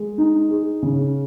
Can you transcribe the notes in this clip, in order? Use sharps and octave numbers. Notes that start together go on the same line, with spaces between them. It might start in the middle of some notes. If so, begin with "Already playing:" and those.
Already playing: G#3
D#4
G#4
C#3